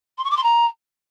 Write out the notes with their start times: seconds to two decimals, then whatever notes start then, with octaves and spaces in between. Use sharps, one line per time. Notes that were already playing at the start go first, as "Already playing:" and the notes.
0.18 C6
0.24 C#6
0.30 D6
0.37 C6
0.43 A#5